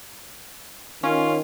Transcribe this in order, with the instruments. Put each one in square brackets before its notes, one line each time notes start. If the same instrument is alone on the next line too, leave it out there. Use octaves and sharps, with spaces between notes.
[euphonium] D#3 [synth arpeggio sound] C#4 [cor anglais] F4